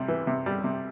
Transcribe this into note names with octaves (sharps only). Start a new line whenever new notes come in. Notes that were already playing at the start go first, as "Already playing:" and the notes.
Already playing: C3 G3
E3
C3
G3
C3